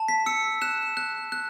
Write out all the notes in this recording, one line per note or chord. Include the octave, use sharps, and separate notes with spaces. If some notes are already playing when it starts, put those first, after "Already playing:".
Already playing: A5
B6
E6 C#7
F#6 E7
F#6
F#6